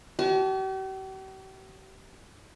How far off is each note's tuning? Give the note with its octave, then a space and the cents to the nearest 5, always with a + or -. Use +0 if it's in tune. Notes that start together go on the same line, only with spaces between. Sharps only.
G4 -45 A5 -45